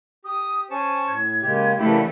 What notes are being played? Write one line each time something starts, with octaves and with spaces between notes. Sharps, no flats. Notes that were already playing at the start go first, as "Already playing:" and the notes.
G4 D#6
C#4 C5 G#5 A5 C#6
A2 G#6
C#3 G#3 A#3 G4
C#3 E3 A3 A#3 D4 E4 G4 B5